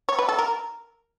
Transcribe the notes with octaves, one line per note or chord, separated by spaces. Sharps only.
C#5
B4
A4
A#4